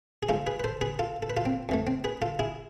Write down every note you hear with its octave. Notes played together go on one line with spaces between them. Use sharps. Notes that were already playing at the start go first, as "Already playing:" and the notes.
G#4
G#2 G#3 F4 A4
G#4 B4
B4
A4 C5
G#4 B4
F4 A4
A4
B4
F4 A4
C4
F2 E3 A3
C4
G#4 B4
F4 A4
E4 G#4